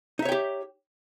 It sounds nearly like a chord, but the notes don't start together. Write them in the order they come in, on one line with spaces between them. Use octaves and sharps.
D#4 E5 C#5 G5 G4